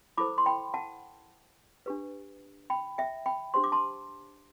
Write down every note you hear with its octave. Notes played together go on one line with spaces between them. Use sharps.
E4 A4 C5 B5 D6
C6
G5 B5
F#5 A5
D4 G4 B4
G5 B5
E5 G5
G5 B5
D4 G4 C5 C6
D6
A5 C6